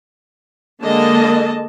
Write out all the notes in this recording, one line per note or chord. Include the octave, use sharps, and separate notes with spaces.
D3 G#3 A#3 D#5 A5